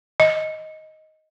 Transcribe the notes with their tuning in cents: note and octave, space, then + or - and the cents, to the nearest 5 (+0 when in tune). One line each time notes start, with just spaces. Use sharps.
D#5 +5